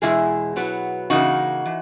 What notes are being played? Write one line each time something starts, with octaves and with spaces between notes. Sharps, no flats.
E2 B2 G#3 E4 G#4
B2 F#3 B3
C#3 E3 A#3 D#4 F#4
E3